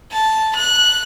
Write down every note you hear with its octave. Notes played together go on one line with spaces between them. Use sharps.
A5
F#6